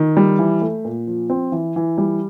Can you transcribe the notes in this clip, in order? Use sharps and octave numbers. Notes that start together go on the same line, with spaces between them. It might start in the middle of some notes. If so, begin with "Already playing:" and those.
Already playing: D#3
G3
E3
A3
A#2
F3
C4
E3
E3
G3